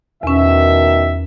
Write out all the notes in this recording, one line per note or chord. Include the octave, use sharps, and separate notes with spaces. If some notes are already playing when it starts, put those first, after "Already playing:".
E2 B2 D#3 C#4 E5